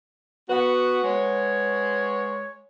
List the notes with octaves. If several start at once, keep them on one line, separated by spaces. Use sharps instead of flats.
B3 F#4 B4 F#5
G#3 C#5